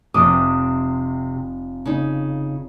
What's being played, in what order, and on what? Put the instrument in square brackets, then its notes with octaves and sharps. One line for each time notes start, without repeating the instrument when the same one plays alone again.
[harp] F1 D6 D#6 [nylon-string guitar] C3
[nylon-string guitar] C#3 D#4